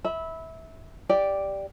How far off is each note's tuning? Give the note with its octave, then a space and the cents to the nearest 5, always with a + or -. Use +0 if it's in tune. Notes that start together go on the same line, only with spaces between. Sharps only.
E5 -20 B5 +0
G4 +0 D5 +0